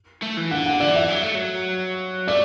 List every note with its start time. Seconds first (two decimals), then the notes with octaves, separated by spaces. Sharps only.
0.22 A3
0.37 E3
0.51 D3 F#5
0.66 F#5
0.80 E3 D5
0.95 E5
1.10 F#3
1.23 A3
1.35 F#3
2.28 A3 D5